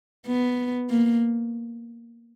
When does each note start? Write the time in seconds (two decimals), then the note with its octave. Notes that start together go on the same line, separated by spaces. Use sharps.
0.27 B3
0.90 A#3